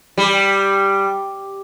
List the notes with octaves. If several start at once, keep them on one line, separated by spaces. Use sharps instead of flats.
G3